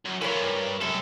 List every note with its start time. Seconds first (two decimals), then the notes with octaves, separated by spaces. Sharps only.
0.06 F#2
0.21 E3 F4 A#4 C#5
0.41 G2
0.81 C2 F#2 A4